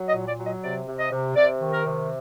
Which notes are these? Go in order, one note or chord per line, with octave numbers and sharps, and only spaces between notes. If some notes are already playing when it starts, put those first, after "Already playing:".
Already playing: F#3
D#5
A#2
D5
F#3
D#5
C3 D5
C3
D#5
C3
C3 D5
D#3
A#4
C3